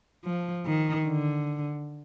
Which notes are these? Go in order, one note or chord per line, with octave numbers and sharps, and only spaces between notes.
F3
D#3
D3